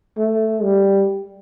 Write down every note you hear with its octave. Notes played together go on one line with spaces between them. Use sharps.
A3
G3